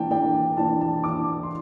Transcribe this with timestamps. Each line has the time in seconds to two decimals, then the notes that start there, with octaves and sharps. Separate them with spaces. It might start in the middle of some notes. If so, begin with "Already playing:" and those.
Already playing: E3 A#3 D4 G5 A5
0.11 E3 A#3 D4 G5
0.57 E3 A#3 D4 A5
0.81 A5
1.04 E3 A#3 D4 D6
1.43 C6